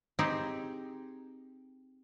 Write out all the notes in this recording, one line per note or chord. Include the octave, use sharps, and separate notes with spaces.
C4 D#4 G4 G#4